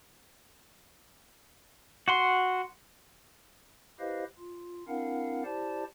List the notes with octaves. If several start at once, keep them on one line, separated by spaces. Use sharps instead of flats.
F#4 F#5 C6
E4 G4 B4 C5 D#5 F5
F4
C4 D4 E4 A#4 F5 F#5
E4 G4 C5 D5 A5